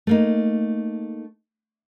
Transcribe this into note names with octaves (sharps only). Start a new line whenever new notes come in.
A3 A#3 D#4